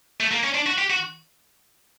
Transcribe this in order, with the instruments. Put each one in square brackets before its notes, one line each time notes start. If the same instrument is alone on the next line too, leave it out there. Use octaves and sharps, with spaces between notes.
[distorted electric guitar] A3
A#3
C#4
D4
F#4
G4
F#4